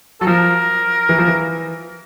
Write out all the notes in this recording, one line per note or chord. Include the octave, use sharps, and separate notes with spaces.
F#3 A4
F3 A#4
E3
F3
E3